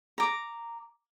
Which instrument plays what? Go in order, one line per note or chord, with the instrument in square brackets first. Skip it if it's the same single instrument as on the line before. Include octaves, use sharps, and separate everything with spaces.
[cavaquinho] A#5 D6